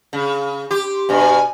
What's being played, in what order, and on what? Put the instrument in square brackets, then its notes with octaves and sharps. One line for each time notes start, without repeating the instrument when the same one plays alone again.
[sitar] C#3
[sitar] G4 [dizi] C6
[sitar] G2 B2 [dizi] G#5